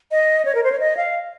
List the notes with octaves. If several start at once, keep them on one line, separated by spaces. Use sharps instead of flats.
D#5
C#5
A#4
C5
C#5
D#5
F5